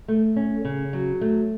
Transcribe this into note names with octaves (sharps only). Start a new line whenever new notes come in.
A3
C#4
C#3
F#3
A3